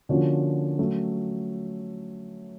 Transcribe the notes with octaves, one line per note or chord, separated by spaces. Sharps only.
D3 F3 A#3 C#4 F#4
F#3 A3 C#4